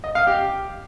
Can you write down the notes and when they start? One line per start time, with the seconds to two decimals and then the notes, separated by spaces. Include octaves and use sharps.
0.04 D#5
0.15 F5
0.27 G4